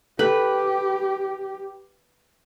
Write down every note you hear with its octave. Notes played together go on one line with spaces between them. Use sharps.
G4 A4 B4